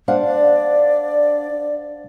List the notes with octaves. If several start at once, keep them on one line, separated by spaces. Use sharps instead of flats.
D4 C5 F5 F#5
D5